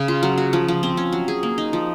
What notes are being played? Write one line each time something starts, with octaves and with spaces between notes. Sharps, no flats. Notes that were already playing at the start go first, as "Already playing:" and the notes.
Already playing: C#3
F4
F#3
F#4
F3
F3
C4
C#4
F#3
G#4
A#3
D#4
F3